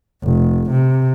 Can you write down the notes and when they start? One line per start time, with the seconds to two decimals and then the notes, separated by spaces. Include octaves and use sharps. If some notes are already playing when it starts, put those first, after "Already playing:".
0.23 F1
0.71 C3